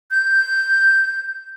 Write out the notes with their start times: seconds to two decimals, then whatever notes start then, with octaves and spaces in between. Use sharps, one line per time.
0.11 G6